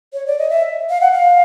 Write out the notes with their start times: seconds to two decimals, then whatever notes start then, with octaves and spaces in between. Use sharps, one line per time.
0.13 C#5
0.26 D5
0.39 D#5
0.50 E5
0.90 F5
1.01 F#5
1.12 F5